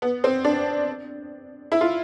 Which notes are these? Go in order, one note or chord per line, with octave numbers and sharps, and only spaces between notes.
B3
C4
D4
E4
F4